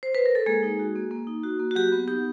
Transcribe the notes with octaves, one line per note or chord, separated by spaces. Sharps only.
C5
B4
A#4
A4
G#3 A#3 G#4
D#4
F#4
A#3
A#3
D#4
F#4
A#3
F#4
F#3 G4
B3
D#4 G4